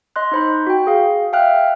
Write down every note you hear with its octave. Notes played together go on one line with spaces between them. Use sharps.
D#5 C6 F#6
D#4 C5 B5
F#4 G5
G#4 F5
E5 F5 G5 F6 F#6